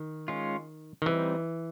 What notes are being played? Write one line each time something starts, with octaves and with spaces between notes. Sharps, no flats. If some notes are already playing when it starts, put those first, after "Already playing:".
Already playing: D#3
G#3 C#4 F4
D#3
E3 G3 C4 D#4